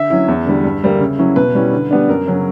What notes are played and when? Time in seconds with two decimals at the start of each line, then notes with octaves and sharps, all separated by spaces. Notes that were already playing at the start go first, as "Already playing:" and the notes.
Already playing: D3 E5
0.10 F#3 C#4 E4
0.28 E2
0.46 D3 G3
0.64 G2
0.83 D3 G3 A#3
1.00 C#3
1.19 F#3 C#4 E4
1.36 B2 B4
1.55 G3 C#4 E4
1.73 D3
1.91 G3 B3 D4
2.09 F#2 A#4
2.27 C#3 F#3 C#4